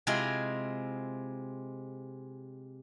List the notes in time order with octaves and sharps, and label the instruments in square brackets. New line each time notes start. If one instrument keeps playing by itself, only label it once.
[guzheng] C3 G#3 C4 E4 F4 G#4